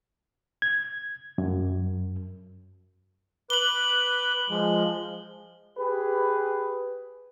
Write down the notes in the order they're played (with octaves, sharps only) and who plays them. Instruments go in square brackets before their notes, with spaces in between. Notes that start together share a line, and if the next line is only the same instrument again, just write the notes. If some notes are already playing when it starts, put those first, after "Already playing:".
[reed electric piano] G#6
F#2
[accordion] B4 D6 [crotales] F#7 G7
[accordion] F3 G#3
[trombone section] G4 G#4 B4